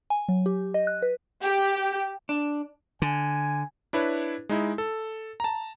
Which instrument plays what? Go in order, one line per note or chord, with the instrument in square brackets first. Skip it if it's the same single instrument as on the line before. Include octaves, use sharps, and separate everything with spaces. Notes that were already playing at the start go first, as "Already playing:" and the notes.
[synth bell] G#5
F#3
G4
D#5
F#6
B4
[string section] G4
[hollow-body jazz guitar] D4
[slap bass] D3 [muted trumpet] G#5
[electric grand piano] D4 E4 B4 C#5
G#3 D#4 E4
A4
A5 A#5